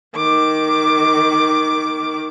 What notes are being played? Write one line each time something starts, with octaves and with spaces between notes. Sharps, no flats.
D#3 D6